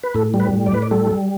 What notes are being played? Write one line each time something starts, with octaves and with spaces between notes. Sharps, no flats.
B4
A2 A4
G3
B4
A2
D5
A2 B4
D5
G3 A4
G3